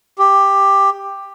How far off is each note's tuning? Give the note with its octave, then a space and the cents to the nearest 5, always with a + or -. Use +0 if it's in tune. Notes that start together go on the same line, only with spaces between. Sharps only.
G4 +10